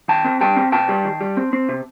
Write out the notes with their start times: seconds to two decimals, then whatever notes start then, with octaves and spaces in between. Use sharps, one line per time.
0.08 D#3 G5 A5
0.25 C4
0.41 G3 G5 A5
0.56 C4
0.72 C3 G5 A5
0.89 G3
1.05 D#3
1.21 G3
1.37 C4
1.53 C4
1.69 C3